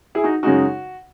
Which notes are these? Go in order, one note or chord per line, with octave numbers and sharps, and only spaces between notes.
E4 G#4
D#4 F#4
F#2 C#3 G#3 D#4 F#4